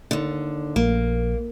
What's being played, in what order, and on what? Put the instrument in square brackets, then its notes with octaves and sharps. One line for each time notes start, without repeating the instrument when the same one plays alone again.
[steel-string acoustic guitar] D#2 D3
[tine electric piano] A#1 [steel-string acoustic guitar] A#3